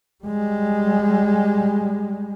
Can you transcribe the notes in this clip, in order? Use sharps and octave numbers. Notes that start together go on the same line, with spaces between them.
G3 G#3